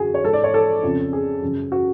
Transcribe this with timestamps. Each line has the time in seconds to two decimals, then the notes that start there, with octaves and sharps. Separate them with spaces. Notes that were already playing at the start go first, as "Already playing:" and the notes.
Already playing: F#2 D3 F#4 G#4
0.14 C#5
0.24 G#2 A4
0.33 D5
0.44 C#5
0.54 A4
0.83 F2 C#3
1.13 G#4
1.42 F#2 C#3
1.72 F#4